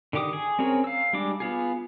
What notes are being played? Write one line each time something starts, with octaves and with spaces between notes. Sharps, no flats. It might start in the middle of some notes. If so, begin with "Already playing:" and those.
D3 D#3 G4 D6 D#6
G#4
C4 C#4 G#4 A#4 C#5
F5 E6
G3 G#3 D4 D6
B3 F4 G#4